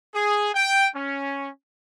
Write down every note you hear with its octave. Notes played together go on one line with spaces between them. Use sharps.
G#4
G5
C#4